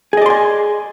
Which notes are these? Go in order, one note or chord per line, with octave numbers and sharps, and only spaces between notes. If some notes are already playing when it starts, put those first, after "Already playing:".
G#4 D5 D#5 G#5 C6